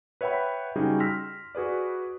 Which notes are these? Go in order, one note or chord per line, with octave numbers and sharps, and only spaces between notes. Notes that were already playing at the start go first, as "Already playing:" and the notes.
B4 C#5 E5 F#5 G5 B5
C#3 G3 D#4 F#4 G#4 G5
C6 E6 F6 A#6 B6
F#4 G#4 B4 D5